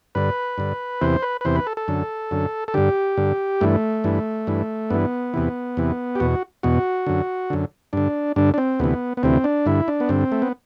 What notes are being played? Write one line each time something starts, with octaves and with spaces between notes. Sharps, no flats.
G2 D3 B4
G2 D3
E2 C3 E3 C5
B4
B4
E2 C3 E3 C5
B4
A4
A4
F#2 D3
F#2 D3
A4
G2 D3 G4
G2 D3
G2 E3 A3
G2 E3
G2 E3
G2 E3 B3
E2 C3 E3
E2 C3 E3
G4
E2 B2 F#4
E2 B2 F#4
F#2 D3
F#2 D3
G2 D3 D4
G2 D3 D4
D4
C4
D2 C3 E3 B3
B3
D2 C3 E3 C4
D4
G2 D3 E4
D4
B3
G2 D3 C4
A3
B3